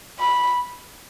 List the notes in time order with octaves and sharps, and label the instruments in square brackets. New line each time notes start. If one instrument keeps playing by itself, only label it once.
[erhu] B5